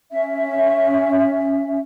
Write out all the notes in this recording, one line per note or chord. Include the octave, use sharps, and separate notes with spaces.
C#4 E5